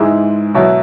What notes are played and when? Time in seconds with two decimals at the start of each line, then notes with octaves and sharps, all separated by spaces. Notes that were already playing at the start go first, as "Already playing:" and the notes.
Already playing: G#2 E3 G#3 E4 G#4
0.54 B2 F#3 E4 C#5